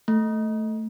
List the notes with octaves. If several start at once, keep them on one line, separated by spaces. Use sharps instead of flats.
A3